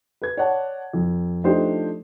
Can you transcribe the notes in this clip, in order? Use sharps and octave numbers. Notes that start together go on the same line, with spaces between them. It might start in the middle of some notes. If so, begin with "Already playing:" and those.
B4 G#6
C#5 D5 F#5 A5
F2
F3 A3 D4 D#4 G4 C5